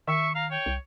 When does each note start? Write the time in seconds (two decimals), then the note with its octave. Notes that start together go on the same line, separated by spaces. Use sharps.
0.08 D#3 E5 C#6
0.35 F5 A#5
0.51 C#5 G5
0.66 C2